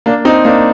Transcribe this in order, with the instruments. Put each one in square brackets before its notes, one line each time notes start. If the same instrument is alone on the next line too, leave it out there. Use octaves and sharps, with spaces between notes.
[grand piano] A#3 D4
C4 D#4
A#3 D4